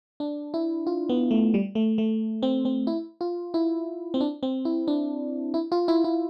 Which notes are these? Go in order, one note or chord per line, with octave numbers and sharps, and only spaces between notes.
D4
E4
F4
B3
A3
G3
A3
A3
C4
C4
E4
F4
E4
C4
D4
C4
E4
D4
E4
F4
E4
E4